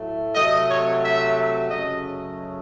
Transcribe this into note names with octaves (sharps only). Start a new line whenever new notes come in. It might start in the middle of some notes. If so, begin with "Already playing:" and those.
Already playing: A2 F#3 A3
C3 F#3 A3 D#5
C#5
E5
F#2 C#3 F#3 A3 D#5